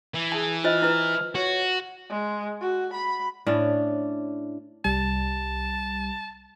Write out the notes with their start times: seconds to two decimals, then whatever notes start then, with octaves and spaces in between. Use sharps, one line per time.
0.14 E3
0.32 G#4 A5
0.64 F4 C5 D#5 F6
0.82 E4 B4
1.35 F#4 C#5
2.09 G#3
2.61 F#4
2.94 B5
3.46 A2 C#4 D4
4.85 C2 G3 A5